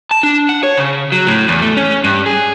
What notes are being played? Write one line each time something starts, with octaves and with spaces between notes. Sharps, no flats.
A5
D4
F#5
C#5
C#3
F#3
A2
E2
A3
C#4
G2
G#4